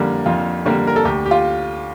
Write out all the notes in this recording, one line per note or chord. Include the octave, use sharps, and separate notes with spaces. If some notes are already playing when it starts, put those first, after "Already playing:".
Already playing: F2 D3 G3 A#3
F2 F4
D3 G3 A#3
A#4
A4
D2 G4
G4
F4